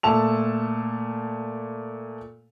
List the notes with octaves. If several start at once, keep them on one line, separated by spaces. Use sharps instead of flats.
A#2 A3 A5 F7